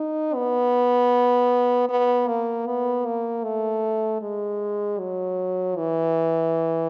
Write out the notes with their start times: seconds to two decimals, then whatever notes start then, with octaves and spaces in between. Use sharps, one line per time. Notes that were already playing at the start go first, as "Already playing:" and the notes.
Already playing: D#4
0.35 B3
1.89 B3
2.28 A#3
2.67 B3
3.05 A#3
3.44 A3
4.22 G#3
4.99 F#3
5.77 E3